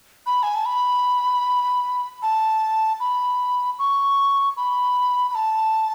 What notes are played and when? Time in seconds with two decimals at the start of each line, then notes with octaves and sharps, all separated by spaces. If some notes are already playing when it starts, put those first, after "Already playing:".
0.27 B5
0.43 G#5
0.55 A5
0.66 B5
2.22 A5
3.00 B5
3.79 C#6
4.57 B5
5.31 B5
5.35 A5